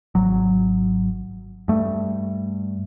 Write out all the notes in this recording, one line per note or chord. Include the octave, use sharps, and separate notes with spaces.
G#1 F#3
G2 A3